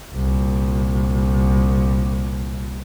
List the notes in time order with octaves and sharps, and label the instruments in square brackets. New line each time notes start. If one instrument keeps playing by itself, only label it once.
[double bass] C2 A#2